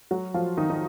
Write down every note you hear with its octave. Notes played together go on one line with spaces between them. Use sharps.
F#3 F#4
F3 F4
D#3 D#4
D#4